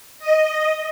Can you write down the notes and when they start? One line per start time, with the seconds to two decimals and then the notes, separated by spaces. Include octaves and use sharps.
0.19 D#5